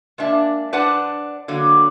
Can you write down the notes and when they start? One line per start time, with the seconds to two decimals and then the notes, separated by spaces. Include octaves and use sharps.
0.18 G#3 A#3 D4 E5
0.73 D4 B4 C5 D5 F#5
1.48 D3 F#3 A#3